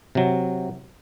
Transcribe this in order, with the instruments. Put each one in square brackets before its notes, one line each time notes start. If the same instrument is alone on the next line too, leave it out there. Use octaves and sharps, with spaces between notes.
[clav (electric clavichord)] C3 F#3